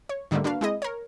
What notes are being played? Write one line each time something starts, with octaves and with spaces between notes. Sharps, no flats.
C#5
G#2 D3 D#3 G3 A3 A#3
A#3 D4 F#4 B4 F5
G#3 C4 E4 G#4 D#5
A#4 C#5